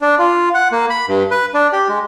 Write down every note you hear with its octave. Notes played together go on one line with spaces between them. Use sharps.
D4
F4
F#5
A#3
B5
G2
B4
D4
G4
G#3